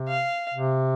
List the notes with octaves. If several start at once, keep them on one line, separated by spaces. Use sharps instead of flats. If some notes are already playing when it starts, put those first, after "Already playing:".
Already playing: C3
F5
C3